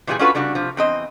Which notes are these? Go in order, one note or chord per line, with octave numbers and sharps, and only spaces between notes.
A#2 E3 G3 C4 G#4 G#5
C#4 D4 F4 F#4 A4 B4
C#3 G3 D4 F#4
C3 F3
E2 C4 D#5